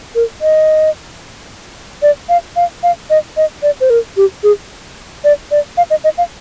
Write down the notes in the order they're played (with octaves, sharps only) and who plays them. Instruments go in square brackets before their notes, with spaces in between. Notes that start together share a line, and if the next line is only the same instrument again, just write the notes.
[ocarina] A#4
D#5
D5
F5
F5
F5
D#5
D#5
D5
C5
A#4
G4
G#4
D5
D5
F5
D#5
D#5
F5